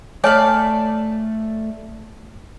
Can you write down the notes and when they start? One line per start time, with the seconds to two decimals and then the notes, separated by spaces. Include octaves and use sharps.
0.24 A3 C#5 D5 F5 G#5 A5 D6